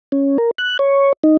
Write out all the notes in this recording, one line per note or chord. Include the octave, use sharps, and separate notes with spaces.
C#4
A#4
F#6
C#5
D#4